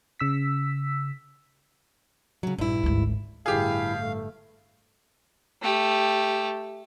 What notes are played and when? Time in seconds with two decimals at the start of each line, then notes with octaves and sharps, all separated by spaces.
0.20 C#3 E6 B6
2.43 C#3 F#3
2.58 A#1 G2 E4
2.83 G#1 D2
3.46 G1 A2 E4 G4 G#4 F5
3.98 A3
5.62 A3 G4